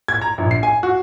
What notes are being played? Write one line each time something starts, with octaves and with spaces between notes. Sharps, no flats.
G#6
A#5
A#1
C7
G#5
F#4